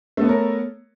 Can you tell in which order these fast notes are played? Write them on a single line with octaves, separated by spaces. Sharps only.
A3 B3 C#5 A#4